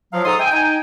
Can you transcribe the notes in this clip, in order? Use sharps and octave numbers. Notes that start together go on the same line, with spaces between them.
F3 F#3 F5
G#2 A4 A#5 C6 D#6
E5 G5 G#5
D#4 G5 G#5